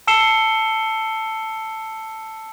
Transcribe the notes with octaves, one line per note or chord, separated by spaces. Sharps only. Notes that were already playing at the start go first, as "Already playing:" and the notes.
A5 E6 C7 C#7 E7 G7